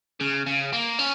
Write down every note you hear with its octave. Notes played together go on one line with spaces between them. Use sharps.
C#3
C#3
A#3
C#4